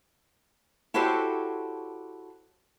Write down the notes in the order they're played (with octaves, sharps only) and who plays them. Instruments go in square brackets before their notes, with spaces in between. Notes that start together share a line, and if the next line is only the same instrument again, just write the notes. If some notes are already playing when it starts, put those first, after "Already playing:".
[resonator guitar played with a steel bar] E4 F#4 G4 A4 C5 C#5